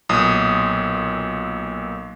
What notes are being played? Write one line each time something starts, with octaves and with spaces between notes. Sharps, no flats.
B1 A#2 D#6